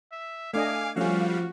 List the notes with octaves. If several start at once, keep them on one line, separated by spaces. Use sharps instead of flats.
E5
A3 D4 D#5 F5 G#5 D6
F3 G3 A3 C#4 F#4 F5